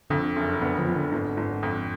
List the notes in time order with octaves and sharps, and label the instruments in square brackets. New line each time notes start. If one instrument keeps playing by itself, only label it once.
[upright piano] F2 [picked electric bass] D3
[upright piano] F#1
[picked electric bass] D3 [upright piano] B3
[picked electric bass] F3
[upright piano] B3
[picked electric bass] D3
[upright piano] G#1
G#1
F2